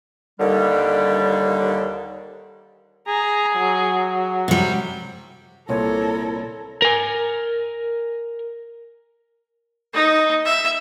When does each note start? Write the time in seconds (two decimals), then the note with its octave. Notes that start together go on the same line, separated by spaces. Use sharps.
0.40 D#2 D3 G3
3.08 G#4 A#5
3.56 F#3
4.48 C3 G3
5.69 C2 A#2 E4 A4 A#4 C#5
6.82 A#4 G#5
9.94 D#4
10.45 E5